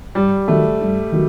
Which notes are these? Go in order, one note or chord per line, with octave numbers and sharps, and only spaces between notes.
G2 G3
D#3 F#3 A3
G2
D#3 F#3